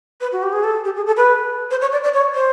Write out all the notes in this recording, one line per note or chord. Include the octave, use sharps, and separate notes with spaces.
B4
F#4
G4
G#4
A4
G4
G#4
A4
B4
C5
C#5
D5
D5
C#5
C5